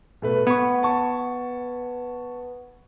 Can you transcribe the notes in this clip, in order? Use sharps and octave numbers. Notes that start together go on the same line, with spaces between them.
B2 A3 B4
B3 C#6 G#6
A5 C#6